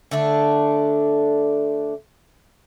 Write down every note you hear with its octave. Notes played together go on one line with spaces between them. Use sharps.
D3 A3 D4